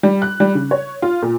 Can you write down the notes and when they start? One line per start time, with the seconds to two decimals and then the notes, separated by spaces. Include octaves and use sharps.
0.03 G3
0.22 F#6
0.40 G3
0.55 C#3
0.71 C#5
1.02 F4
1.23 A#2